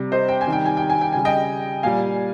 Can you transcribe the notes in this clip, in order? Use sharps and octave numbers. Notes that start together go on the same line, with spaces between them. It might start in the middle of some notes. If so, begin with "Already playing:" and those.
Already playing: C3 G3
C5 D#5
G5
G#5
C3 D#3 G3
G5
G#5
G5
G#5
G5
C#3 G3 G#5
D#5 G5
A#2 G3 F5 G#5